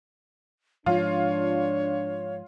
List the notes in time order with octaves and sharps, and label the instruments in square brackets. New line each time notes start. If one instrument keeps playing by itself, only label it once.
[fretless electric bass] G#2 F3 [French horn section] D4 [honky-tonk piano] F4 [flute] C#5